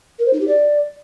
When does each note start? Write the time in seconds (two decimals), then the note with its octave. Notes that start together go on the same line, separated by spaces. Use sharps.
0.19 A#4
0.26 C5
0.33 D#4
0.41 G4
0.48 D5